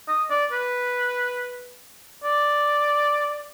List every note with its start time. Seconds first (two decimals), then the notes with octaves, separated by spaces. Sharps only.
0.08 D#5
0.30 D5
0.52 B4
2.24 D5